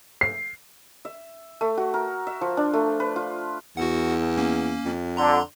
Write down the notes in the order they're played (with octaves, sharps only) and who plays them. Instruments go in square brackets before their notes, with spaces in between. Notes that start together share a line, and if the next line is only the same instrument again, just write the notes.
[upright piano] C7
[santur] E5
A3
F#4
A#4
E5
F3
D4
A3
B4
F4
[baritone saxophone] E2 [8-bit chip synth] F#4 F#5
[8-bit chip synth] A#3 C#4
[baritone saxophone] F2
[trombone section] D3 [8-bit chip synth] A#5 C6